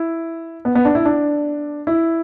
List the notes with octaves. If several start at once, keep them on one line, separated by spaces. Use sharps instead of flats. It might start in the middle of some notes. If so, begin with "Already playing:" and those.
Already playing: E4
B3
B3
D4
E4
D4
E4